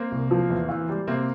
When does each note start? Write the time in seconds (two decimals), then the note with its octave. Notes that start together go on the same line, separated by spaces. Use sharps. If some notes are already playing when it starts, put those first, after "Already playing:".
Already playing: A#3 C4
0.11 C2
0.31 F3
0.50 E2
0.69 E3
0.89 G3
1.07 C3 A#3 C4